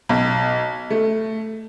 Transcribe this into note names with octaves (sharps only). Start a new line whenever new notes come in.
B1
A3